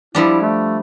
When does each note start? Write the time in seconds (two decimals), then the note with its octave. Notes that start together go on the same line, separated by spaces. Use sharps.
0.15 F3 G3 D4 E4
0.42 A3